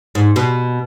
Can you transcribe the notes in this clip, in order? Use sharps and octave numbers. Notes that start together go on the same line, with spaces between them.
G#2
B2